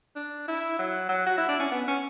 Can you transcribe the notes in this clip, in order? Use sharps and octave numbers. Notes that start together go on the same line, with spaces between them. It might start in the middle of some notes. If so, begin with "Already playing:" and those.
D4
E4
F#3
F#3
F#4
E4
D4
C#4
B3
C#4